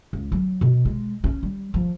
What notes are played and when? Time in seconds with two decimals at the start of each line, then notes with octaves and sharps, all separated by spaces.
0.13 C#2
0.32 F#3
0.61 B2
0.85 G#3
1.24 C#4
1.43 G3
1.74 F3